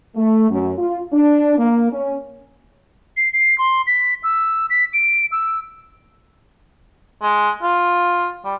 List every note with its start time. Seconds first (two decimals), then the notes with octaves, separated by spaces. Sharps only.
0.16 A3
0.50 F#2
0.78 F4
1.12 D4
1.58 A#3
1.92 C#4
3.17 C7
3.33 C7
3.58 C6
3.87 B6
4.23 E6
4.70 B6
4.94 D7
5.32 E6
7.22 G#3
7.63 F4
8.44 G3